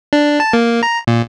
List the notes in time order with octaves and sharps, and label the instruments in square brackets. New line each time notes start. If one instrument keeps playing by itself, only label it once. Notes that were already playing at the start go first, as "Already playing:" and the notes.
[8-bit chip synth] D4
A5
A#3
A#5
A#2